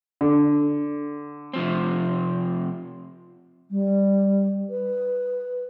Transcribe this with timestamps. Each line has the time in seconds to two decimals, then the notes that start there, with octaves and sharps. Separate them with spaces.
0.21 D3
1.54 C3 F3 C4
3.70 G3
4.69 B4